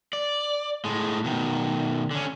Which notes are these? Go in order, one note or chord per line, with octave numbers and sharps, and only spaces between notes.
D5
A2 G#3
B2 D#3
D3 C#4